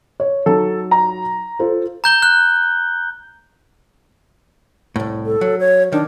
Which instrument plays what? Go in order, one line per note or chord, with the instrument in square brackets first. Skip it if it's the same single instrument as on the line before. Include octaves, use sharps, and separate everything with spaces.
[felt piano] C#5
[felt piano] F#3 D#4 [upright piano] A4
[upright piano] A#5
[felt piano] F4 A4 C5
[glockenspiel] A#5 G6 G7
F#6
[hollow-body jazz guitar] C2 A2
[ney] A4
[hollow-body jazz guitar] F#3
[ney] C#5
[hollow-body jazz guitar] D#3 [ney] D4